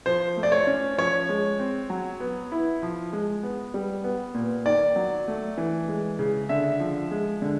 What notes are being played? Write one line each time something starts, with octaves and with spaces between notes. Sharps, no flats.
F3 C5
A3
D5
C#5
C#4
F3 C#5
G#3
C4
F#3
B3
E4
F3
G#3
B3
G3
B3
A#2
D#3 D5
F#3
A3
E3
G#3
C#3
D3 E5
F3
G#3
D3